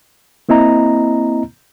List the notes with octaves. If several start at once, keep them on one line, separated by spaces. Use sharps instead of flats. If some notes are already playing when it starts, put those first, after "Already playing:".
A#3 C4 E4 D#5 A#5